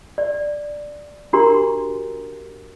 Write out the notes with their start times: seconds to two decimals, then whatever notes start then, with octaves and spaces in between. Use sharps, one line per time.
0.18 D5
1.33 D4 F#4 G4 A#4 A#5 C6